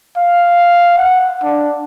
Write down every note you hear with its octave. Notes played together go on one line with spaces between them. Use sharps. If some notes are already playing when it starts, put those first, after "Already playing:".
F5
F#5
D4